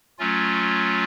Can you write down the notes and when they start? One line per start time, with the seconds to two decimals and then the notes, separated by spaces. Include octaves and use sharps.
0.18 F#3 A3 C#4 F4